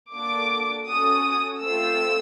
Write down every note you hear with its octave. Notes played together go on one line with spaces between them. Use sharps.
A#3 D4 F#4 A4 D6
C#4 F#4 A4 D#6
A3 C4 F4 E6